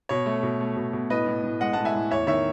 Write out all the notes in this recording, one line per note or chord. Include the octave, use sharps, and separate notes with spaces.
B2 C#5
A3
B2
A3
B2
B2
A2 B4 D#5
A2
A2
G#3 D#5 F#5
A2 F#5 A5
E5 G#5
A2
E2 C#5 E5
D#3 C#5 E5